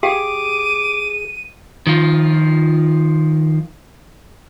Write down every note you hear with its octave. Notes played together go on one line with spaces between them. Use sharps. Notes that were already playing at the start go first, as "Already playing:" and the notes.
G4 G#4 F5 G5 D6 D#7
D#3 F3 F4